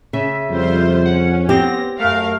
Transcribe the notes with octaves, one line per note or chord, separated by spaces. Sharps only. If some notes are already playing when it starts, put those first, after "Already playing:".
C#3 E5
F2 G3 F4 C5
C#4 F#5
B3 C4 G4 A#6
F#2 A3 A#4 F5